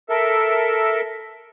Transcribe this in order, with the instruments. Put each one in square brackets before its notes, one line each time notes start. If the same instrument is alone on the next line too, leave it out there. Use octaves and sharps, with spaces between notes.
[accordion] A4 A#4 E5